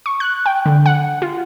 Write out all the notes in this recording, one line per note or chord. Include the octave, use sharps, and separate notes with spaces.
C#6
F#6
G5
D3
F#5
F4